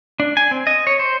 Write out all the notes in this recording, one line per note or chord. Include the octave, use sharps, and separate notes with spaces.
D4
G#5
C4
D#5
C#5
C5